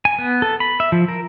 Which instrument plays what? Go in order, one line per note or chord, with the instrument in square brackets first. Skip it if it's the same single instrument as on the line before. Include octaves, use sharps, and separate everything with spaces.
[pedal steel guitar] G#5
B3
A4
B5
E5
F3
A#4